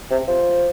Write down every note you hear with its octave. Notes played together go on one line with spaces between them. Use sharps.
C3
F3